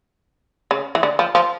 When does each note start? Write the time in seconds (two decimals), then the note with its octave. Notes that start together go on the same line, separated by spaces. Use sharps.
0.71 C#3
0.95 E3
1.03 D3
1.19 F3
1.35 F3